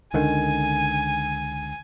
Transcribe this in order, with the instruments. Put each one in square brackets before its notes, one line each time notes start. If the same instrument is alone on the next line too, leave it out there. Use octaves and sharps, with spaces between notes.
[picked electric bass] C#2 D3 D#3 [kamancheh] G#5